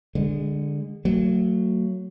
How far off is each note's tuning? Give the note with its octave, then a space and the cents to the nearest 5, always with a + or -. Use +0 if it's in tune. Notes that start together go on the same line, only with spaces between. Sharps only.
D3 +0 G#3 -25
F#3 +0 A3 +45